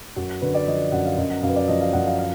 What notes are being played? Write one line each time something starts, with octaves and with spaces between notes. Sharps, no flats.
F#2 F#4
D3 B4
D5
F3 D#5
D#5
F#2 F#5
F5
F#2 D#5
F#5
F#2 F5
B4
D5
F3 D#5
F5
F#2 F#5
F5
F5